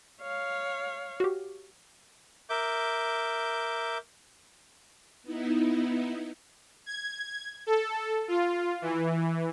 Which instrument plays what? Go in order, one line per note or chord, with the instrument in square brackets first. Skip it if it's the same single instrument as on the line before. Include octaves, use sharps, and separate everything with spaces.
[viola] C#5 F5
[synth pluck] F#4 G4
[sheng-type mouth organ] A#4 E5 D6 G6
[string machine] B3 D#4 E4
[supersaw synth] G#6
A4
F4
E3